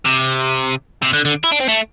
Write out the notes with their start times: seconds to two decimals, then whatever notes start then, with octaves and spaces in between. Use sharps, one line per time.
0.06 C3
1.03 C3
1.13 D3
1.25 D3
1.44 E4
1.52 D4
1.60 C4
1.68 A3